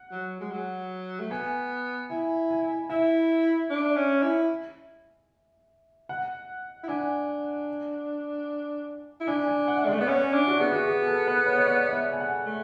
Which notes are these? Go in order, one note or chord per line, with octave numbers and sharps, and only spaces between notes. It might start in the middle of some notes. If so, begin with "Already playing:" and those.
Already playing: F#5
F#3
G#3
F#3
A3
B3 G#5
E4 G#5
G#5
E4 E5
D4
C#4
E4
F#5
E4
D4 G#5
E4
D4 G#5
G#5
F#5
E5
G#3 D5
A3
B3 D5
C#4 C#5
D4
F#4
B3 G#4
F#4
G#4
A4
B4
C#5
C#5
D5
D5
E5
G#5
F#5
A3